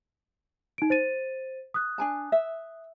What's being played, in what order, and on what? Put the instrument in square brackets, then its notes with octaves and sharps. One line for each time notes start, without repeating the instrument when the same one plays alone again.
[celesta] D#4 D7
C5 A6 D#7
D#6 F#6
[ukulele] D4 G#5 A5
E5